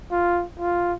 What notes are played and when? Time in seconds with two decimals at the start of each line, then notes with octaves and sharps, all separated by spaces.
0.11 F4
0.60 F4